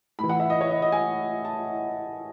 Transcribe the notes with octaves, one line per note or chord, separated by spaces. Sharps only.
A2 E3 B5
F#5
E5
D#5
C#5
D#5
D#5
G#5
A5